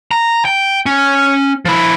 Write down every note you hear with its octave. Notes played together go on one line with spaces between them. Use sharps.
A#5
G5
C#4
F3 E4